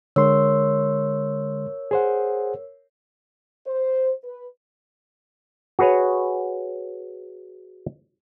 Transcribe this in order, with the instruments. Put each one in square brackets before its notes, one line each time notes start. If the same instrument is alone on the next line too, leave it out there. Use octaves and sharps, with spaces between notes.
[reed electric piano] D3 G#3 C6 [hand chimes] A#4 C#5 E6
[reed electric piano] G#4 C5 F#5
[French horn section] C5
B4
[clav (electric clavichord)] F#4 G#4 B4 C#5